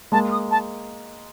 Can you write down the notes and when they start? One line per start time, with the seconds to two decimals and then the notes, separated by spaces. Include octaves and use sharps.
0.12 G#3 A#3 A5
0.31 D#6
0.51 A5